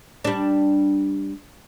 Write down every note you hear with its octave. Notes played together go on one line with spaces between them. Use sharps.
G3 D4